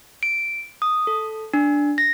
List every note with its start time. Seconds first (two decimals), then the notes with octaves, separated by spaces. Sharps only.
0.23 D7
0.82 D#6
1.07 A4
1.53 D4
1.98 A#6